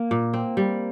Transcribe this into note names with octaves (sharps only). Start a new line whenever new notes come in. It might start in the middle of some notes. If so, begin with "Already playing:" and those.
Already playing: A#3
A#2
C4
G3